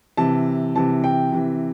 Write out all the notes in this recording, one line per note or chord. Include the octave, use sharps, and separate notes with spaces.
C3 E3 A5
C3 E3 A5
G5
C3 E3